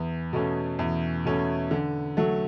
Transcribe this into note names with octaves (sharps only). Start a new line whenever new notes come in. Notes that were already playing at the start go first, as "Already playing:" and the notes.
Already playing: E2
B2 A3 C#4
E2
B2 A3 C#4
D3
F#3 A3